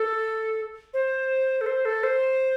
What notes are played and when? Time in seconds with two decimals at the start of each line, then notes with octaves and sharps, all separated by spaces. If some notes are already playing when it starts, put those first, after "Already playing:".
Already playing: A4
0.94 C5
1.61 A4
1.66 C5
1.85 A4
2.03 C5